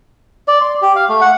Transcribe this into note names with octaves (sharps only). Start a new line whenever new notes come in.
D5
C6
G4
F5
A3
F#5